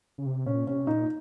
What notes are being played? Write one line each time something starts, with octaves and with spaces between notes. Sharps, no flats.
C#3
C3
A#2 C#4
C3 C#4
A#2 D#4